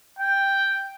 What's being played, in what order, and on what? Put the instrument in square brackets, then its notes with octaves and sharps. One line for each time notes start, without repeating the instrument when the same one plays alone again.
[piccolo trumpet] G5